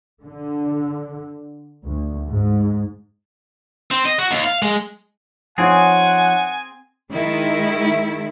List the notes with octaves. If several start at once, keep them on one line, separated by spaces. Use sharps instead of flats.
D3
D2
G#2
C4
D#5
F#4
D#2
F5
G#3
F3 C4 D#4 G#4 C#5 F#5 G#5
D#3 G#3 E4